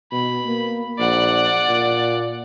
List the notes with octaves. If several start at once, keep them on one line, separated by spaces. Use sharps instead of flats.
B2 B5
A#3
A#1 D5 F#5
A#2